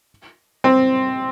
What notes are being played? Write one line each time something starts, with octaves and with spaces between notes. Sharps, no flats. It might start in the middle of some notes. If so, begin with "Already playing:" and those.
C4